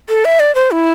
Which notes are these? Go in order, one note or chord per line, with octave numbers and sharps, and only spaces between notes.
A4
E5
D5
C5
E4